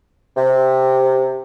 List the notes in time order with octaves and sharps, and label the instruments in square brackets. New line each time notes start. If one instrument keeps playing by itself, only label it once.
[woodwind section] C3